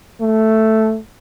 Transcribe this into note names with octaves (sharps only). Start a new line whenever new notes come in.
A3